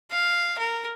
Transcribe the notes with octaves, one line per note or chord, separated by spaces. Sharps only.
F5
A#4